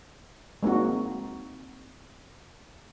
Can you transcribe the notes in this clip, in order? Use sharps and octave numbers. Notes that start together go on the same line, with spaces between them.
G#3 A#3 C4 D#4 F#4